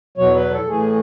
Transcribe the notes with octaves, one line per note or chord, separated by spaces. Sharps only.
E2 B2 F#3 C#5
B4
A4
A2 E3 A3 G#4